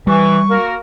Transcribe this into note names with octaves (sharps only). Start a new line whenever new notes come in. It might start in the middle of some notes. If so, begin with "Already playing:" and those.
E3 G3 C#6
A#3 F#4 A#4